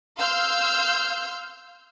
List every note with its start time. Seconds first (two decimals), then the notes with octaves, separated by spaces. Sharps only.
0.17 F5 C6 E6 F6 G6